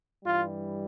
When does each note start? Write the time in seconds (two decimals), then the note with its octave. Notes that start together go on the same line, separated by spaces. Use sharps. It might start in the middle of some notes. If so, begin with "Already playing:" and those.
0.24 G2 E3 G3 F4